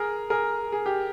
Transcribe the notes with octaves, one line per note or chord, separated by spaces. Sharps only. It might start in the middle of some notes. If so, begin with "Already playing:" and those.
Already playing: G#4 A#4
G#4 A#4
G#4
G4